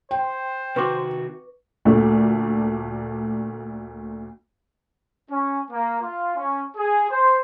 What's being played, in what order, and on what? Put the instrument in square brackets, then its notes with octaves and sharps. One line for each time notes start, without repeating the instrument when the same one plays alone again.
[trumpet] C5 [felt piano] G5
[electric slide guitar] C3 D#3 F#4 [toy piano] B4 C#6 D6
[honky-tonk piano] D2 A#2 A3 D4
[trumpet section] C#4
A#3
F4
C#4
G#4
C5